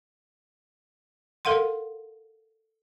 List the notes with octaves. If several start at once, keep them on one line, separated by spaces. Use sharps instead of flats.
A4 A#4 F5 F#5 C6